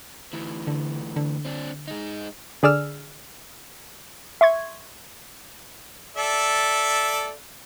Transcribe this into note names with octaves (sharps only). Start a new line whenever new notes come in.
D2 E3
D3
D3
C4 D4
G#3 D#4
D3 G#4 D5 E6 F6
E5 C6 C#6 G#6
A4 D5 E5